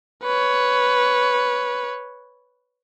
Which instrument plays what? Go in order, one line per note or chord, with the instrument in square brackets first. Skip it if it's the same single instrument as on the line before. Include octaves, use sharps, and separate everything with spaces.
[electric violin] B4 C#5